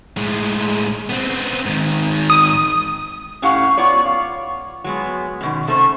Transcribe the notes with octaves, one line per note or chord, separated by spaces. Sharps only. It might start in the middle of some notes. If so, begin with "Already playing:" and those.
A2 G#3
B3 C4
G#2 D#3
D#6
A2 C#4 G4 F5 F#5
B3 F4 C#5 D5
F5
F#3 G#3 B3
F#2 B2 D#3
C3 A3 C#4 C5